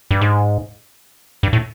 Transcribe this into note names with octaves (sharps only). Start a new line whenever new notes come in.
G2
G#2
G2
A2